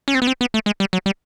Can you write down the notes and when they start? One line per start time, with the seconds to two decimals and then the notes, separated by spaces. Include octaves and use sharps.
0.08 C#4
0.15 C4
0.22 B3
0.27 C4
0.41 B3
0.54 A3
0.66 G#3
0.80 G3
0.93 F#3
1.06 G3